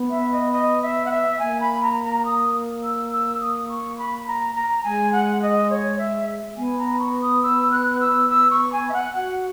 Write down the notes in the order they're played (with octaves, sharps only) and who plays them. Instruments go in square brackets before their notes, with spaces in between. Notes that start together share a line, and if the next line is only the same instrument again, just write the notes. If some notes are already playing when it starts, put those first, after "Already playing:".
Already playing: [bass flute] B3
[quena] E5
D#5
D#5
E5
F#5
E5
[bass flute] A#3 [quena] G#5
[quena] B5
A#5
A#5
D#6
E6
E6
D#6
C#6
B5
A#5
A#5
[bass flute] G#3 [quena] G#5
[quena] F#5
D#5
C#5
E5
[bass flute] B3 [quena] G#5
[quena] A#5
C#6
D#6
E6
F#6
E6
E6
C#6
G#5
E5
F#5
[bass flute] F#4 [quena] F#5